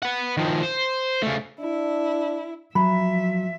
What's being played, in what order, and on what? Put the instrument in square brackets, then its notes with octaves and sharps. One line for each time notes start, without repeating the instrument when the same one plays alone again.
[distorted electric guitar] B4 F#5
D#3 F3
C5
C#3 A3
[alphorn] D4 [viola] E4
[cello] F3 E5 [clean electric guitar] F#3 [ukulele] B5